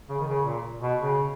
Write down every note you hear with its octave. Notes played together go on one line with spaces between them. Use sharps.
C#3
D#3
C#3
A#2
B2
C#3